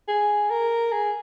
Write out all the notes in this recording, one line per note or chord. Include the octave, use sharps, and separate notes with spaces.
G#4
A#4
G#4